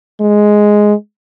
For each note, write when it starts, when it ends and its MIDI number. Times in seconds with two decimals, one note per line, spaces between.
0.21 0.94 56